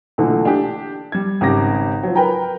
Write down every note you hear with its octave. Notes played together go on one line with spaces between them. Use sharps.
B1 A#2 D3 E3 A3
D4 G4
G3 G#6
G#1 C#3 G4 D6 A#6
F3 F#3
A#4 B4 G5 A#5